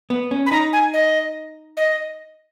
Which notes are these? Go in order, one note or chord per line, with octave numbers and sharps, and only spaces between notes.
B3
C#4
B5
D#4 A#5
G#5
D#5
D#5